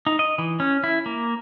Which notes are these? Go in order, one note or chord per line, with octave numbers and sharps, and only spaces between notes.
D#4
D#5
E3
C#4
E4
A#3